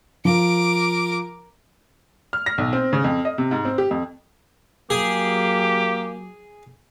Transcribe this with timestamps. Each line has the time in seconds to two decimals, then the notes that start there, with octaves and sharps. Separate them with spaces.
0.25 F3 A#4 D6
2.33 F6
2.46 A#6
2.58 B1
2.73 C4
2.93 C#3
3.04 F2
3.25 D#5
3.38 C3
3.51 G#2
3.65 C4
3.78 G4
3.91 F2
4.90 F#3 A#3 G4 G#4